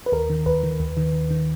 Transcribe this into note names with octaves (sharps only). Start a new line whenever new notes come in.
B4
D#2 A#4
D#3
D#2 B4
D#3
D#2
D#3
D#2
D#3